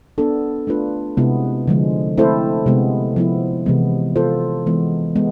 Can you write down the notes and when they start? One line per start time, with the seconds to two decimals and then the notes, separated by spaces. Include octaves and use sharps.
0.18 B3 D4 A4
0.67 A3 D4 F4 B4
1.17 C3 G#3 B3 E4
1.68 D3 F3 G#3
2.18 A3 C4 E4 A4 C5
2.66 C3 G#3 B3
3.16 F3 B3 E4
3.66 C3 E3 G#3 B3
4.16 B3 F4 A4 C5
4.67 E3 G#3 B3
5.16 G#3 B3